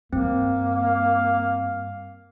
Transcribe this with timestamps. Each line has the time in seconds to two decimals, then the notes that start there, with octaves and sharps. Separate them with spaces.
0.13 G2 A#3 C4
0.76 F5